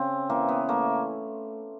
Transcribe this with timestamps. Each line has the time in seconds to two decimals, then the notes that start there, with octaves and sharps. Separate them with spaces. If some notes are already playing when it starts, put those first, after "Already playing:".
Already playing: C#3 C4
0.30 E3 A#3
0.49 B3
0.69 A3 A#3